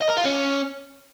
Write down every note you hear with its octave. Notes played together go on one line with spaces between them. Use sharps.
D#5
A#4
F4
C#4